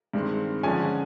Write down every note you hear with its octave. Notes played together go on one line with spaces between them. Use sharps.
G2 D#3 G#3 C4
D3 F3 G#3 C#4 G#5